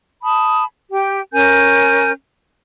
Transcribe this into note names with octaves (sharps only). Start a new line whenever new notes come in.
A5 B5 D#6
G4 G5
C#4 A#4 G#5 G6